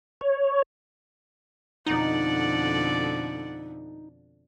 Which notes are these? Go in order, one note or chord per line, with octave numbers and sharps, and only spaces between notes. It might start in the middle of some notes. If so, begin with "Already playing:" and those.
C#5
F2 B2 D3 D#4 D5 F#5